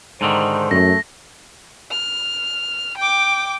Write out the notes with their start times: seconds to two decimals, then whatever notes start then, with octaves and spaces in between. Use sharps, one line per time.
0.21 G#2 D3 D#3 C5
0.71 F#2 A3 A#6
1.91 F6
2.98 G5 D6